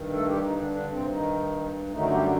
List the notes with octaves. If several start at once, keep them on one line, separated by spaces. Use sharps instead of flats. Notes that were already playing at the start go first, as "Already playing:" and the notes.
Already playing: G2 D#3
A3 A4
G3 G4
D#3 D#4
D3 D4
D3 D4
C3 C4
D#3 D#4
F#2 D3 D#3 F#3 A3 D#4
G3 G4